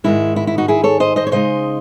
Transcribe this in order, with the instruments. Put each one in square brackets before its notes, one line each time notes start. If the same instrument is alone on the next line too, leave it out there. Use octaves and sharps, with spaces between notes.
[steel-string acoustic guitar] G#2 D#3 G#3 E4
E4
E4
D#4 F#4
E4 G#4
A4 C#5
C5 D#5
C5 D#5
C#5
C#3 G#3 D#4 C5 D#5